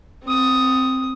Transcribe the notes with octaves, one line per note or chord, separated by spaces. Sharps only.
C4 D#6